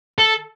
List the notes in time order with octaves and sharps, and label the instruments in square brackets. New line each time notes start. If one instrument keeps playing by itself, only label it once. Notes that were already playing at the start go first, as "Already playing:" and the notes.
[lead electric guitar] A4